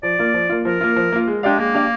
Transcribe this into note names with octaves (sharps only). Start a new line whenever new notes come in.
F3 D5
A#3 F4
F3
A#3 F4
F3 A#4
A#3 F4
F3
A#3 F4
G#3
G#3 D4 G4 D5 F5
G#3 A#3
D4 G4 D5 F5